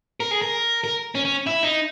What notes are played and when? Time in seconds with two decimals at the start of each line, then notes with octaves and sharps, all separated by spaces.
0.20 A#4
0.31 G#4
0.42 A#4
0.84 A#4
1.15 C#4
1.25 C#4
1.47 E4
1.63 D#4